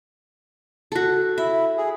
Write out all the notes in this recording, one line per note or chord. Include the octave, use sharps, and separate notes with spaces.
F#4 A4
E4 E5
G#4